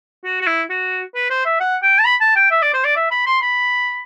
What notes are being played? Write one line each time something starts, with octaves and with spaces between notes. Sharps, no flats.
F#4
F#4
E4
F#4
B4
C5
E5
F#5
G5
A5
B5
A5
G5
E5
D5
C5
D5
E5
B5
C6
B5